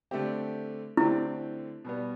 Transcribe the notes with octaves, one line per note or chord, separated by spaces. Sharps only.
D3 A3 C4 G4
D3 A3 C4 E4 G4
B2 G3 B3